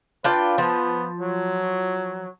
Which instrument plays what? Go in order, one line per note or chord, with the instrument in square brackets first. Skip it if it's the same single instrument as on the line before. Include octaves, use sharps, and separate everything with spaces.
[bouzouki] D4 F4 G5 [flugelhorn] B4
[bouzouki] F3 [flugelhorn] B3
[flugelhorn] F#3